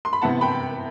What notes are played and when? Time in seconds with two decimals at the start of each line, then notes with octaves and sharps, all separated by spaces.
0.05 C6
0.13 B5
0.22 C3 E3 B3 E4 F#5 A5
0.41 G5 B5